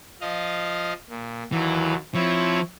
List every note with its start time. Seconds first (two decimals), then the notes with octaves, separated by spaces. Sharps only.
0.21 F3 D#5 F5
1.09 A#2
1.52 D#2 E3 F#3
2.15 F3 C4 E4 C#5